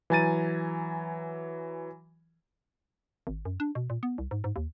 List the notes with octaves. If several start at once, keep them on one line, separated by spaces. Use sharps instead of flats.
E3 F#3 G#5 A#5 A6 D#7
G#1
F#2
D4
B2
A#2
B3
C2
G#2
G#2
D#2